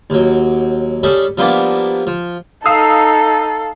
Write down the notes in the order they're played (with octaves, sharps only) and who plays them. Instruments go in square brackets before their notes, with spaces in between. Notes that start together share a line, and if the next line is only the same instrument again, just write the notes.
[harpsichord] D#2 F#3
G3 C#4 G#4 A4
F3 G3 A#3 B3 D4
F3
[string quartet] D#4 [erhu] A4 [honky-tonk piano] F5 D#6 E6